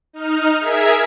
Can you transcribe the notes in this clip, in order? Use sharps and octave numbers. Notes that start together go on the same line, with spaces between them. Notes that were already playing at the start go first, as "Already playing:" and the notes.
D#4 F6
G#4 A#4 E5 G#6 B6